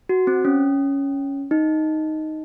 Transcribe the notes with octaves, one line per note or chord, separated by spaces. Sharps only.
F#4
C4
C#4
D#4